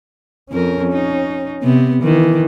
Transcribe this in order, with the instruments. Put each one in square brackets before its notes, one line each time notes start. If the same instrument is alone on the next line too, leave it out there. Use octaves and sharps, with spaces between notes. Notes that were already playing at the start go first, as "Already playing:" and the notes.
[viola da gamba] F2 A#4 [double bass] C#4
[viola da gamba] D#4
C3 B3
[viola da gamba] D#3 [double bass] E3